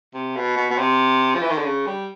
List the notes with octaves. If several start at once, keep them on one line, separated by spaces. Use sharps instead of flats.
C3
B2
B2
B2
C3
F3
E3
D#3
D3
C#3
G3